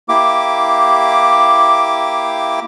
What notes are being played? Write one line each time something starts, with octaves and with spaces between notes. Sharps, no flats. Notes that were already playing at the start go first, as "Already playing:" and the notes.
A#3 E4 G4 D6